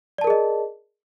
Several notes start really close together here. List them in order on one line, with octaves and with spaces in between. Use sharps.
D5 A5 A#4 G#4 D#5